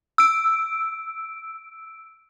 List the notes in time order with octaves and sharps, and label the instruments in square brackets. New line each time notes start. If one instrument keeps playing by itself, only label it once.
[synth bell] E6 D7